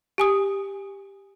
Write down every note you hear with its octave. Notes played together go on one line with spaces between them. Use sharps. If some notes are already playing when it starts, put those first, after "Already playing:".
G4 G#5 D#6